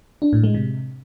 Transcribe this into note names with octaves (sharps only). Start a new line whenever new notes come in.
D4
A2
G#3
C3